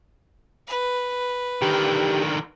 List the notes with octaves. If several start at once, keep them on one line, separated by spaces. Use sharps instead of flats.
B4
D3 D#3 G4